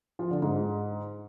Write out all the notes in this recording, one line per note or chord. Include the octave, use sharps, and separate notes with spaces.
F3
D3
G#2